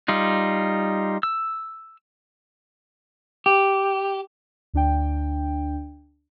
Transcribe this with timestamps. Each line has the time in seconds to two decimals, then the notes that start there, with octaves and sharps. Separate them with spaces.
0.08 G3 D#4 F4
1.23 E6
3.46 G4
4.74 D2 D4 G5